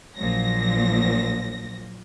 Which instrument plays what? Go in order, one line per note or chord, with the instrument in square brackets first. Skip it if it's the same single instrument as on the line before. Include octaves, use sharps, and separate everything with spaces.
[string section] A#1 A#2 F3 F#3 A#6